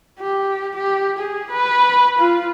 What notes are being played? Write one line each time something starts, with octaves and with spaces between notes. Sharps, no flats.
G4
G4
G#4
B4
F4